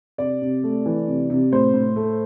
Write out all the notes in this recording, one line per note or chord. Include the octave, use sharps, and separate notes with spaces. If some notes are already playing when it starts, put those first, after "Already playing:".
C3 D5
C3
A3
E3
C3
C3
A2 C5
A2
A3